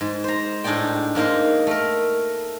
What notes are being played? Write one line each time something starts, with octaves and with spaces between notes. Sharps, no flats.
G#2
C5 A#5
A2 D4 D#4 G#4 D5 G5
G#2 A#3 D#4 A#4 C6
A3 A#4